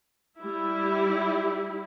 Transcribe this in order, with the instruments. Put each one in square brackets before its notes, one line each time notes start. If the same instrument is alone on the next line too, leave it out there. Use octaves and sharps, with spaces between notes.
[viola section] G3 E4